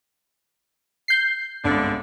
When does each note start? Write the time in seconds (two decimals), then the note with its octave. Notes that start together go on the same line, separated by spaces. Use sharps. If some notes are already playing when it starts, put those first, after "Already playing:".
1.08 G6 C7
1.65 G1 C2 G#2 D3 D4